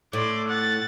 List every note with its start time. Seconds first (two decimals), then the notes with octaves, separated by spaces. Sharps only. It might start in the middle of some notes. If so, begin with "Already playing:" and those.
0.13 A2 D5 C6
0.48 F#5 A6